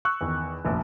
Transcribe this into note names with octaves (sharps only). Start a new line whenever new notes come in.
C#6 E6 F#6
E2 D#3
F1 A#1